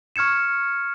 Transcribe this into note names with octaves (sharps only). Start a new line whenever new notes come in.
C#6 F6 G#6 C#7 E7